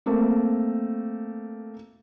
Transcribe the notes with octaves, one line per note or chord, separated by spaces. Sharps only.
A3 A#3 C4